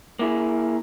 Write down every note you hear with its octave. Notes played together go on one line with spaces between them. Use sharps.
A#3 E4 G#4